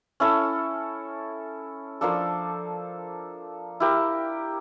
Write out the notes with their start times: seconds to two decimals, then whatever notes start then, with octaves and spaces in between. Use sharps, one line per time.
0.20 C#4 E4 A4 C#5
2.01 F3 A#3 D4 A4
3.80 E4 G4 A#4